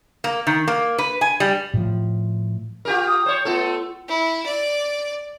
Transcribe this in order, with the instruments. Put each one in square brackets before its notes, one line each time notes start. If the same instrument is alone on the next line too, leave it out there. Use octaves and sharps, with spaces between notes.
[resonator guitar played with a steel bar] A#3
D#3
A#3
B4
G#5
G3
[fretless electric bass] A2 F3
[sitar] F4 G4 A#4
[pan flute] D#6
[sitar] C5 C#5
[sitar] A3 B3 A4 [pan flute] F4
[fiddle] E4
D5